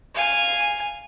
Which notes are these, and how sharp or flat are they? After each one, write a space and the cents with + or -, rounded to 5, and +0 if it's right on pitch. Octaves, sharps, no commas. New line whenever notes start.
F5 +0 G#5 -10